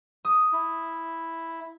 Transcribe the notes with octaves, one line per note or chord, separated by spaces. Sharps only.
D#6
E4